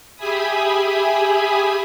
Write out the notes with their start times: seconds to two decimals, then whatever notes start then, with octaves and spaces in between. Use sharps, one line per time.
0.17 G4 G#4 E5 G#5 B5 D#6